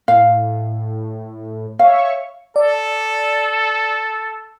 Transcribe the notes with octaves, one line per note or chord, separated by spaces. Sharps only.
A2 F5
C#5 E5 F5 C#6
A4 D5